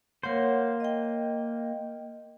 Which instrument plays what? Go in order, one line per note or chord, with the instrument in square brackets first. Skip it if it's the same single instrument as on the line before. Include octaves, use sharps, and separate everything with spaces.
[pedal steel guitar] A#3 C5 [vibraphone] A#4 C#5 F#5
[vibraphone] D#5 G5